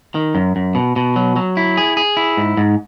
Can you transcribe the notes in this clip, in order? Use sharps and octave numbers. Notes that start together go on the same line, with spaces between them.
D#3
F#2
F#2
B2
B2
F#3
F#3
E4
G#4
G#4
E4
G#2
G#2